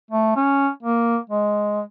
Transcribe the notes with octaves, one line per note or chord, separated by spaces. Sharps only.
A3
C#4
A#3
G#3